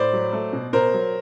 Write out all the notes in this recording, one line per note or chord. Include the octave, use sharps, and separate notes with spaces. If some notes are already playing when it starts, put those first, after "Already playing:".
Already playing: A2 C5 D5
F#3
A3
B2
B2 A#4 C5
F#3